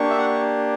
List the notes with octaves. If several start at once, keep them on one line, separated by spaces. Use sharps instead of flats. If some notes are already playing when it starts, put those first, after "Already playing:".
Already playing: A#3 D4 G4 C#6
E5
F#5